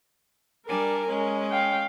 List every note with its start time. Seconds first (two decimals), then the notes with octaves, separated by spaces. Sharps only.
0.67 G3 D4 A#4 G#5
1.07 G#3 C#4
1.51 F5 G5